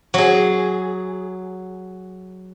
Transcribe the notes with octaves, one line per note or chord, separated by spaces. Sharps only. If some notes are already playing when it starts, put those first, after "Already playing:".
F#3 G#4